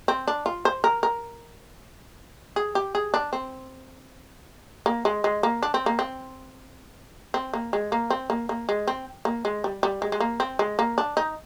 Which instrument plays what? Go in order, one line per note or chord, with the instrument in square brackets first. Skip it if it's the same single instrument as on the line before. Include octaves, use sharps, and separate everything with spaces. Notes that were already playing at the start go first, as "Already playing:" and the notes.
[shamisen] C4
D4
F4
C5
A#4
A#4
G#4
G4
G#4
D4
C4
A#3
G#3
G#3
A#3
D4
C4
A#3
C4
C4
A#3
G#3
A#3
C4
A#3
A#3
G#3
C4
A#3
G#3
G3
G3
G#3
G#3
A#3
C4
G#3
A#3
D4
D#4